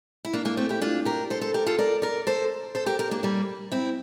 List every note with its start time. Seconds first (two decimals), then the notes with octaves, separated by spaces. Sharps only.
0.25 E4
0.33 A#3 D4
0.45 A#3 D4
0.57 A3 C4
0.69 E4 G4
0.82 D4 F4
1.05 G4 A#4
1.30 A4 C5
1.41 A4 C5
1.54 G4 A#4
1.67 F4 A4
1.79 A#4 D5
2.02 A#4 D5
2.27 A4 C5
2.75 A4 C5
2.86 G4 A#4
2.99 G4 A#4
3.11 A#3 D4
3.23 G3 A#3
3.72 C4 E4